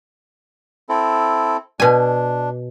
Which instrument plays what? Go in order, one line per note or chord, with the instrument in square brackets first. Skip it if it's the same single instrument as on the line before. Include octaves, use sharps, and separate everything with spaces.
[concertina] C4 E4 A4
[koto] B2 G#5 [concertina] D4